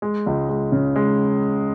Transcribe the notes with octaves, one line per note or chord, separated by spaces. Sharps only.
G#3
C#2
G#3
C#3
G#3